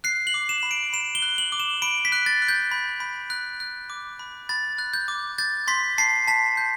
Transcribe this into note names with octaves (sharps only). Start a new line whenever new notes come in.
F#6 C7
F#7
D6
E7
B5
D7
B5 E7
G7
F#6
F#7
D6
E7
B5 D7
B6
F#6
A6
F#6
G6
B5
B5
F#6
F#6
D6
B5
B5 A6
F#6
G6
D6
G6 A6
C6 B6
A5 C7
A5 B6
G6